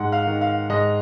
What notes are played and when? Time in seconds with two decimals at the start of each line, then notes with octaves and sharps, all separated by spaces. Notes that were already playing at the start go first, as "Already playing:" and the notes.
Already playing: G#2 F#5
0.12 F5
0.26 D#3
0.41 F5
0.69 G#2 D#5